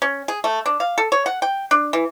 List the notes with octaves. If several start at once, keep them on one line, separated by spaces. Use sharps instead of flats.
C#4
G#4
A3
D4
F5
A4
C#5
F#5
G5
D4
E3